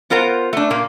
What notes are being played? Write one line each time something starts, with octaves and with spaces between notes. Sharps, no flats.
B3 F4 A#4 C5 F#5
A3 D4
A#2 A#3